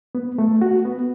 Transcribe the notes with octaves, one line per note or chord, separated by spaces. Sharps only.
B3
A3
F#4
B3